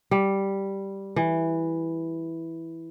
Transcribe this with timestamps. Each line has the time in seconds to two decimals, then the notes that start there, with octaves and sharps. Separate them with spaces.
0.11 G3
1.16 E3